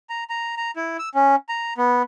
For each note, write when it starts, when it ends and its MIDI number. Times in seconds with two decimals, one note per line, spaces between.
0.10 0.24 82
0.30 0.55 82
0.57 0.71 82
0.76 0.97 64
0.99 1.09 88
1.15 1.36 61
1.49 1.74 82
1.78 2.02 59